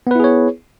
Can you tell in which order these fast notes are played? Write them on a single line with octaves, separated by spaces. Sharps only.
B3 B4 E4 G#4 C#5